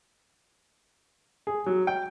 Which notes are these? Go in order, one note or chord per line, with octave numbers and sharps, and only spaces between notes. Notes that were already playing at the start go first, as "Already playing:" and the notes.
G#4
F#3
G5